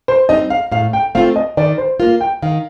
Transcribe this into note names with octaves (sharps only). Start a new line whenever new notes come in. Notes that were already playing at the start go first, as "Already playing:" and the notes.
C5
G3 C4 D#4 D#5
F5
A2 F5
G5
A3 C4 F4 F5
D#5
D#3 D5
C5
A#3 F4 A#4
G5
D#3 F5